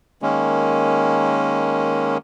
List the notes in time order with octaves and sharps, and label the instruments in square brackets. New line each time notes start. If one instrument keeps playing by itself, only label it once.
[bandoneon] D#3 G#3 A#3 C#4